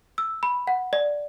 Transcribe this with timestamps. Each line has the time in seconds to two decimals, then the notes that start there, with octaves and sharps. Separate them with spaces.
0.18 E6
0.43 B5
0.67 F#5
0.93 D5